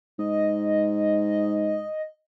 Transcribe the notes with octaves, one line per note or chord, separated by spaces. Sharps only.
G#2 D#5